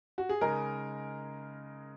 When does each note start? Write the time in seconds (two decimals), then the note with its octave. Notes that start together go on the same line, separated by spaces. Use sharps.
0.18 F#4
0.29 G#4
0.41 C#3 G#3 D#4 G#4 A#4 D#5